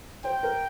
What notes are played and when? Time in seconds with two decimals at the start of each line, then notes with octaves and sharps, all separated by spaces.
0.24 C5 G5
0.43 A#4